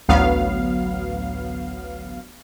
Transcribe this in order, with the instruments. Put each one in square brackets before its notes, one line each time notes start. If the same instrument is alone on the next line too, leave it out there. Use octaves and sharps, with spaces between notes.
[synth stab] A1 D2 F#3 B3 F5